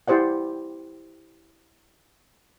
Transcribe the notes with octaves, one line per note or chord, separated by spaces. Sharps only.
E4 G4 C5 D5 F#5